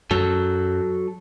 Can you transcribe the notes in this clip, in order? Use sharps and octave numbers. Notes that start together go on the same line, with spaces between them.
F#2 F#3 A4